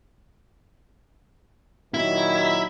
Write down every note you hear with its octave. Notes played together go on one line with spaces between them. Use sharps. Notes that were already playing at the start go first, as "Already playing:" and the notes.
A#2 D#3 F#3 E4